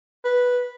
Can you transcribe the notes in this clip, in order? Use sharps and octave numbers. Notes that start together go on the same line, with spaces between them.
B4